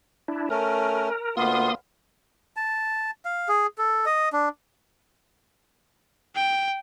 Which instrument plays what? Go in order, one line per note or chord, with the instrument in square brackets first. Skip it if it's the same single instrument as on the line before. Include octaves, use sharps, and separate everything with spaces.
[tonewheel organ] D4 E4
[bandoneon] A3 C#4 [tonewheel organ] A#4
[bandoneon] D2 B3 F4 [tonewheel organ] A#3 C6 D#6
[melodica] A5
F5
G#4
A4
D#5
D4
[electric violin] G5